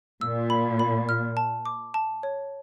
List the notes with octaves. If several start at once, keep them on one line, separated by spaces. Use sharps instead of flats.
A#2 E6
B5
B5
F6
A5
D6
A5
C#5